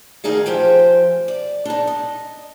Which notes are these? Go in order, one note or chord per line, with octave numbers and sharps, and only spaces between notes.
D2 D#3 D#4 G#4 F5
F3 G4 C5 G5 G#5
D5
D4 D#4
D#5